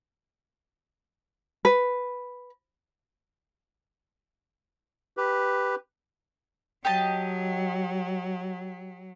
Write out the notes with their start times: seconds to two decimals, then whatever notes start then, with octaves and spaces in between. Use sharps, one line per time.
1.65 B4
5.17 G4 B4
6.85 F#3 G4 D#5 A5